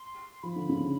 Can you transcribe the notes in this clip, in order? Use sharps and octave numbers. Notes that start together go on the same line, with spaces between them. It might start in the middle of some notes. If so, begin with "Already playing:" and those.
Already playing: C6
F3 B5
D3
C#3